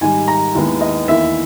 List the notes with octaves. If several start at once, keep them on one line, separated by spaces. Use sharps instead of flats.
G#2 D#3 G3 G#5
A#5
D#2 D#3 G#3 B3 E4
D#5
E2 D#3 A#3 E4 E5